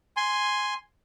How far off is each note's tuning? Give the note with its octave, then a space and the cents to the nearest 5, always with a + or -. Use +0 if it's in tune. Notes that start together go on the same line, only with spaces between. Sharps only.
G#5 +0 C6 +0